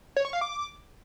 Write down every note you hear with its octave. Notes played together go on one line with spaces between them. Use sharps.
C#5
C#6
F5
D6